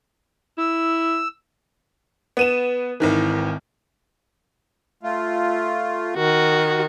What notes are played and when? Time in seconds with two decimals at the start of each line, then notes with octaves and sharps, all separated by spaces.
0.58 E4 E6
2.37 B3 D#7 E7
3.00 G#1 D#3 E3
5.03 A3 F4
6.17 D#3 F#4